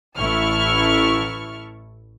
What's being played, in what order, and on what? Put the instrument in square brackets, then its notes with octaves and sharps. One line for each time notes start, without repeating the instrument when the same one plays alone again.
[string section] A1 E4 A5 C#6 F6